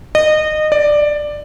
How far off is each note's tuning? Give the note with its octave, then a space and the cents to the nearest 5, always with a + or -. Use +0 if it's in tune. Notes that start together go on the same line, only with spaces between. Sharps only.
D#5 -25
D5 +10